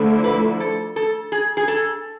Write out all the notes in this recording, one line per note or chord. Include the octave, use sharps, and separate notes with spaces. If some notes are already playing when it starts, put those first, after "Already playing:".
Already playing: D3 F3 A3 E4
B4
A4
A4
G#4
G#4
A4